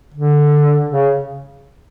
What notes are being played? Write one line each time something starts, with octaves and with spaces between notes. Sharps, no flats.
D3
C#3